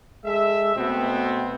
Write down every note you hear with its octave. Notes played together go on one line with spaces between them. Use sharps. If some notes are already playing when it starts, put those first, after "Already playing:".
G#3 A4 E5
B2 A3 B3 C4